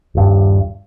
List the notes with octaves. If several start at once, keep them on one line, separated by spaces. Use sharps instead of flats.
D#1 G2